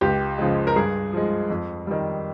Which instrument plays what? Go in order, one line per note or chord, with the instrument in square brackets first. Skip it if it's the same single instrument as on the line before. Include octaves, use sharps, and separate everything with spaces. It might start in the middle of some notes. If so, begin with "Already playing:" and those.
[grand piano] C#2 G4
C#3 F3 G#3
A#4
G2 G#4
F3 G#3
F2
D#3 G3